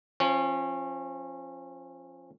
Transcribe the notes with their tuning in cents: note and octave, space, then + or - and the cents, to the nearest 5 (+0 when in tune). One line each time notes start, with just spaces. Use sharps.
F3 +0 C#4 -30